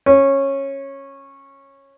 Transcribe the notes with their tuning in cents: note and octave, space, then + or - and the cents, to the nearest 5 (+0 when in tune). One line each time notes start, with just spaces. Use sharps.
C#4 -15